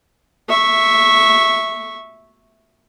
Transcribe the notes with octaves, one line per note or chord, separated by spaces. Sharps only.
E5 C#6